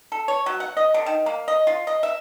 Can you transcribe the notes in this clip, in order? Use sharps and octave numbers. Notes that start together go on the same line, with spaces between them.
A4
C#5
F#3
F#5
D#5
D3
D#3
A#3
D#5
F4
D#5
E5